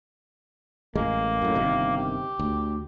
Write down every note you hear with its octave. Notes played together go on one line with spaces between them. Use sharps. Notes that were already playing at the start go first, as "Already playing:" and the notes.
A1 G#3 A#3
F#2 A2
G1 C3 D#3
G4
D2